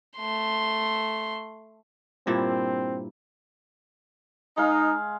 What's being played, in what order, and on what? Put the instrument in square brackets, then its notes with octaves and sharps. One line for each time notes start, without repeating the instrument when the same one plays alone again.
[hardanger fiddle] A3 C6
[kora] G2 A#2 E4 [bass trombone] C4
[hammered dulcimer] G#3 F5 [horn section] D#4